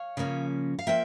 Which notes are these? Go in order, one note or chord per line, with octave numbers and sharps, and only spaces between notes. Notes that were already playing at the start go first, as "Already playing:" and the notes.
Already playing: C#5 F5
C#3 F3 A#3 C#4
F5
F3 A#3 E5 G5